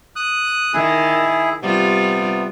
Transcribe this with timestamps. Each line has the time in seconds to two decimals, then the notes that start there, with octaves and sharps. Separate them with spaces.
0.16 D#6 F#6
0.74 D#3 E4 G#4
1.62 C3 G3 B3 F4